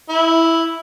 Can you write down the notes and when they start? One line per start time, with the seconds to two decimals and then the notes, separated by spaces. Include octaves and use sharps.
0.09 E4